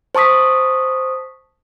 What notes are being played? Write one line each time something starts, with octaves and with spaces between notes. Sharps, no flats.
C5 A5 C#6 D#6 B6